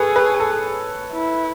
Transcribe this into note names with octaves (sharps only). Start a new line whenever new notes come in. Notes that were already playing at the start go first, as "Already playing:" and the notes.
Already playing: G#4 A4 B4 C#5
B4
A4
E4